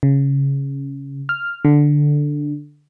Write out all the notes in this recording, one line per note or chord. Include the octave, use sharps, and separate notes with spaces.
C#3
F6
D3